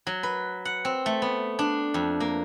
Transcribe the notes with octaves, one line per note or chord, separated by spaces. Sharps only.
F#3
B4
F#5
C4
A3
B3
D4
F2
A#3